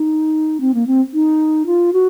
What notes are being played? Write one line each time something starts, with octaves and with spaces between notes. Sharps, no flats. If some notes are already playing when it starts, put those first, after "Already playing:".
Already playing: D#4
C4
A#3
C4
D#4
F4
F#4